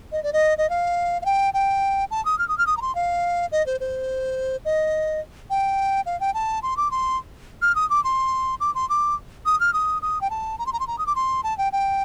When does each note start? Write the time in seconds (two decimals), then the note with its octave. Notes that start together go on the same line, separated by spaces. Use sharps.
0.12 D#5
0.23 D5
0.33 D#5
0.58 D#5
0.70 F5
1.22 F5
1.25 G5
1.54 G5
2.11 A5
2.25 D#6
2.39 F6
2.48 D#6
2.58 F6
2.67 D#6
2.77 A#5
2.82 C6
2.95 F5
3.52 D#5
3.66 C5
3.80 C5
4.65 D#5
5.50 G5
6.06 F5
6.20 G5
6.34 A5
6.63 C6
6.77 D6
6.91 C6
7.62 F6
7.75 D#6
7.90 D6
8.04 C6
8.60 D6
8.75 C6
8.90 D6
9.46 D#6
9.60 F6
9.73 D#6
10.02 D#6
10.21 G5
10.30 A5
10.59 A#5
10.66 C6
10.73 A#5
10.80 C6
10.87 A#5
10.99 D#6
11.07 D6
11.16 C6
11.44 A5
11.58 G5
11.73 G5